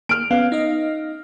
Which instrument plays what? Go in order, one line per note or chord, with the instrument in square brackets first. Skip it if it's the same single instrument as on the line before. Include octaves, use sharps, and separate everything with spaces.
[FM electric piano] A#3 [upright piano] F6 D7
[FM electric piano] B3 C#4 [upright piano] F5
[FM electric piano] D#4 D#5